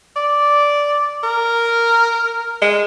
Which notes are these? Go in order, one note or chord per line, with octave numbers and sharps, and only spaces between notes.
D5
A#4
G#3